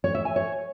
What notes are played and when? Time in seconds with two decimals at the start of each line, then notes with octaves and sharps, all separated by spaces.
0.04 C#5
0.15 E5
0.25 G#5
0.36 C#5